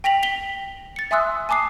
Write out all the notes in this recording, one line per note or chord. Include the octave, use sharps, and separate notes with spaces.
G5 A#6 B6 F7 F#7
B6 F7 G7
A6 C#7
E5 G#5 C6 D#6 E6 F#6
G#5 A5 D6 D#6 C7